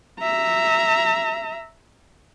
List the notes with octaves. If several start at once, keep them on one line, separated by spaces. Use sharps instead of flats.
E5 A#5